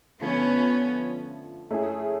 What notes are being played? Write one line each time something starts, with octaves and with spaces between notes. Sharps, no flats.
D3 F3 A3 B3 C#4
A3 C#4 E4 G#4